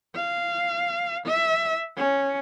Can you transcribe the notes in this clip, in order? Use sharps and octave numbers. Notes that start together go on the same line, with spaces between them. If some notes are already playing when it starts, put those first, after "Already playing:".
F5
E5
C#4